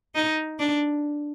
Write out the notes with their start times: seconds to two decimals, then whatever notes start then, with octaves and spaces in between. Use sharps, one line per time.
0.15 D#4
0.59 D4